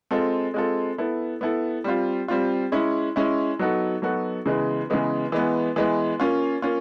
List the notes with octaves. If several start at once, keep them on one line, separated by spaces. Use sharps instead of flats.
G#3 C4 F4 A4
G#3 C4 F4 A4
B3 E4 A4
B3 E4 A4
G3 C4 F4
G3 C4 F4
G#3 C#4 E4
G#3 C#4 E4
F#3 B3 D#4 F#4 A4
F#3 B3 D#4 F#4 A4
C#3 E3 G#3 B3
C#3 E3 G#3 B3
E3 G#3 B3
E3 G#3 B3
A#3 C#4 F4
A#3 C#4 F4